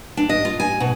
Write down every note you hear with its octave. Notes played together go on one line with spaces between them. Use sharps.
D4
D#5
F4
G#5
B2